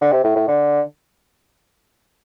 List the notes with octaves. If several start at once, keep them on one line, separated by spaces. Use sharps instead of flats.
D3
C3
A2
A2
D3